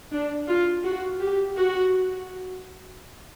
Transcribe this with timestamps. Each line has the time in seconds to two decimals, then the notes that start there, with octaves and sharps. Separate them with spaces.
0.13 D4
0.49 F4
0.84 F#4
1.20 G4
1.56 F#4